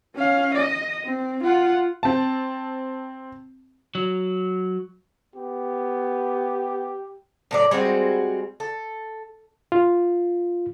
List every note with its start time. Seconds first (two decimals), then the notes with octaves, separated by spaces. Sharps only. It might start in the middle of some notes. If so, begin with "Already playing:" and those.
0.15 C#4 F5
0.55 D#5
1.04 C4
1.44 F4 F#5
2.03 C4 A5
3.95 F#3
5.36 B3 G4
7.51 A2 F#3 D5
7.71 G3 G#3 C4 F#4
8.60 A4
9.72 F4